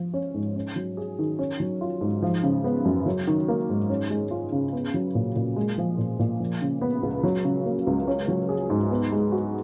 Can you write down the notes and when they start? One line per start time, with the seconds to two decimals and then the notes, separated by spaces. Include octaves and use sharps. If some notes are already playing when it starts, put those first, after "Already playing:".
Already playing: F3
0.14 C#4
0.34 G#2
0.56 C#4
0.76 F#3
0.97 G#4
1.19 D#3
1.39 C#4
1.60 F#3
1.81 F4
2.01 G#2
2.22 F3
2.43 C#3
2.64 B3
2.85 F#2
3.06 F#3
3.27 D#3
3.48 A#3
3.69 G#2
3.89 C#4
4.10 G#3
4.31 F4
4.52 C#3
4.73 B3
4.94 F#3
5.15 A#2
5.36 A#2
5.56 G#3
5.78 F3
5.98 A#2
6.19 A#2
6.40 F3
6.61 C#3
6.81 B3
7.03 C#2
7.23 F#3
7.44 C#3
7.66 A#3
7.87 C#2
8.07 C#4
8.28 F#3
8.49 G#4
8.70 G#2
8.90 B3
9.12 G#3
9.32 F#4